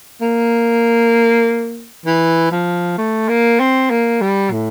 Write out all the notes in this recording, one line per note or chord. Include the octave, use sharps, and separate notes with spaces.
A#3
E3
F3
A3
A#3
C4
A#3
G3
A2